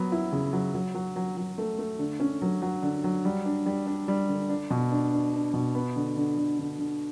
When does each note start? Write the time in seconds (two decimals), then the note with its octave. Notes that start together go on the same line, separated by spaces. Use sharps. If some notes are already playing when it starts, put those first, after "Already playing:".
Already playing: F#3 B3
0.12 E4
0.33 C#3
0.53 F#3
0.74 F#3
0.95 F#3
1.16 F#3
1.37 F#3
1.58 A3
1.79 A3
1.99 D3
2.20 C#4
2.42 F#3
2.62 F#3
2.82 D3
3.04 F#3
3.25 G3
3.45 D4
3.66 G3
3.87 D4
4.08 G3
4.29 D3
4.49 D4
4.71 B2
4.92 D4
5.12 D4
5.33 D4
5.54 B2
5.75 B3
5.96 D3
6.16 D3
6.37 D3
6.59 D3
6.79 D3